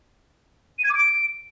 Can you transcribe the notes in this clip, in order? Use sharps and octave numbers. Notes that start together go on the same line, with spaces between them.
D#7
G#6
D6
D7